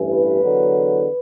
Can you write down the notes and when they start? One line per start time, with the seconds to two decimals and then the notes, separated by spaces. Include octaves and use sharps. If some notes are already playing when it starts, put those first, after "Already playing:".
Already playing: A1 G2 E3
0.11 B4
0.42 E2 D3 F#3